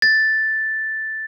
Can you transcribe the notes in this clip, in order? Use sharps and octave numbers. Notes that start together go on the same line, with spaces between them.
A6